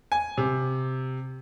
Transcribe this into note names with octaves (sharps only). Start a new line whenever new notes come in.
G#5
C3